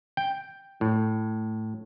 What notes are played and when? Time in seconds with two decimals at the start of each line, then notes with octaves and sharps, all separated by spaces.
0.17 G5
0.81 A2